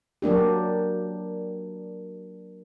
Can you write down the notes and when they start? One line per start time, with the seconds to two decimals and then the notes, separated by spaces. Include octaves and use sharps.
0.22 F#3 A#3 D4 G4